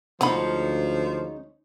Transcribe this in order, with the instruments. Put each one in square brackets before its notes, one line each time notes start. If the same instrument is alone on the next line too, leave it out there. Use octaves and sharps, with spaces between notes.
[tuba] D2 [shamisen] D3 B5 [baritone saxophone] F3 [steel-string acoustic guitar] G#3 C#4 D#4